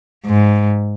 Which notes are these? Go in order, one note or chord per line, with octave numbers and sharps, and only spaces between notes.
G#2